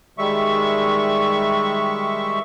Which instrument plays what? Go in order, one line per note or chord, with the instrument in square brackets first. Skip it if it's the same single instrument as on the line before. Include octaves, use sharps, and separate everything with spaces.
[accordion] D#3 G3 G#3 E5 C#6